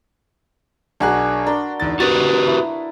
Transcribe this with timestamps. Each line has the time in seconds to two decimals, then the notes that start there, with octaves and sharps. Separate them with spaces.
1.00 B1 D4 F#4 G#4 A#4 F#6
1.46 D4 A#4 C6
1.80 E2 G#2 A6
2.00 F#4 G4 B4 C6 A6
2.47 E4